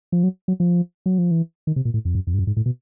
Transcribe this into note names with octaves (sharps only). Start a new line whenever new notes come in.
F3
F#3
F#3
F3
F#3
F3
E3
D#3
C3
A#2
A2
F2
F#2
F2
G2
F#2
G#2
A2
B2